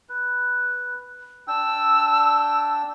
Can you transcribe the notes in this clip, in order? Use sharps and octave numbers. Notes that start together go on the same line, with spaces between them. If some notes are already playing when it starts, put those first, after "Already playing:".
B4
D4 G5 E6